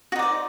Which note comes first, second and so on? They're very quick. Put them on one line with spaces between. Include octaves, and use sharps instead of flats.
F#4 D#4 D5 C5